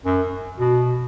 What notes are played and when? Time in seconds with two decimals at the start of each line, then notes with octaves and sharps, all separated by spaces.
0.05 F#2
0.59 B2